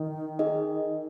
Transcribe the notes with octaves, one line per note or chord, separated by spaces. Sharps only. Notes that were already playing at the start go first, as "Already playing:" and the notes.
Already playing: D#3
D#4 G#4 D#5